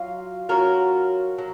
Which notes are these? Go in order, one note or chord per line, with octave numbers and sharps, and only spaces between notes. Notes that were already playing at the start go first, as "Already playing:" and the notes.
Already playing: F#3 F4
F#3 C#4 F4 F#4 A#4
F#3